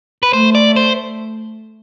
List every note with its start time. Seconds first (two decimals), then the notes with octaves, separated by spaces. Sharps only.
0.23 B4
0.33 A3 C5
0.55 D5
0.76 C5